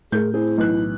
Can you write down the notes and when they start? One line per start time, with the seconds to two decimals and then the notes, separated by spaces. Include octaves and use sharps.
0.12 A2 G#4 A#4 G6
0.34 C4 E4 G#4
0.58 B1 E3 F#6